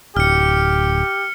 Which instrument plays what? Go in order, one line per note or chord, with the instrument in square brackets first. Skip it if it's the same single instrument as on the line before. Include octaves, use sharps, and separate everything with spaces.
[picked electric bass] D1 [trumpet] G4 [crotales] F6 C#7